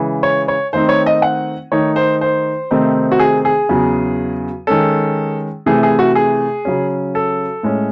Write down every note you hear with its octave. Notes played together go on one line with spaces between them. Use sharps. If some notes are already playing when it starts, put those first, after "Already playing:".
Already playing: C#3 E3 G#3
C#5
C#5
D#3 A3 C4 D#4 C5
C#5
D#5
F#5
D#3 A3 D#4 C#5
C5
C5
C3 D#3 A3 C4 D#4
F#4
G#4
G#4
E2 C#3 F#3
D#3 G#3 C#4 A4
C3 E3 A3 G#4
G#4
F#4
G#4
C#3 F#3 C#4
A4
A2 G#3 C#4